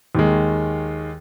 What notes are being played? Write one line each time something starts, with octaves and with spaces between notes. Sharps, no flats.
D#2 D#3 G#3